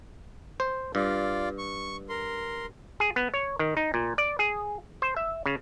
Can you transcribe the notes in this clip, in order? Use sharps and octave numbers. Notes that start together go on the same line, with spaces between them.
C5
G2 F4 D5
C#6
A#4 C6
G#4
B3
C#5
D#3
D#4
A#2
D5
G#4
C5
E5
C#3